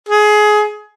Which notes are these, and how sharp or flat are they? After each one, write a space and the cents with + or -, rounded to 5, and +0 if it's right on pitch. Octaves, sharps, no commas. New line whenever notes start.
G#4 +20